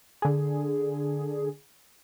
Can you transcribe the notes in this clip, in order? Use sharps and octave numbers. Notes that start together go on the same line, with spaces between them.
D3 G#4